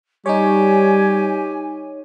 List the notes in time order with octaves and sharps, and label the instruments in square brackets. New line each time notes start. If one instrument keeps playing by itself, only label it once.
[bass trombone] G3 [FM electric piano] D#4 C#5 [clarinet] G4 [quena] G#5